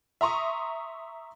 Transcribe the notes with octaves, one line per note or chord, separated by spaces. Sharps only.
E5 A#5 C6 C#6 D#6